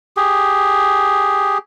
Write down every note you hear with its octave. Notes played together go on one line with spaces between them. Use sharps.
G4 G#4